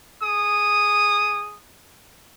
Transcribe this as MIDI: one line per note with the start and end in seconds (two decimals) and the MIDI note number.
0.23 1.58 68
0.23 1.58 87